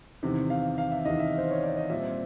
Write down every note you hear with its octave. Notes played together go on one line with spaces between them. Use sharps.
E2 C3 D#3
F5
F5
E5
E2 C3 D#3 D#5
E5
C5
C#5
D5
D#5
A#2 G3 C4 E5